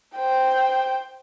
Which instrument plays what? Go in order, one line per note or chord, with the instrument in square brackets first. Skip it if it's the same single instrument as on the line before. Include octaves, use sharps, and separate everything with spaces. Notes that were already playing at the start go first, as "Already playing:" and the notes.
[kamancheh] C5 G5